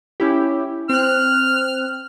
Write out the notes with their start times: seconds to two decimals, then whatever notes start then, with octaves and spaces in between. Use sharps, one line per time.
0.20 C#4 E4 G4
0.90 C4 F6 F#6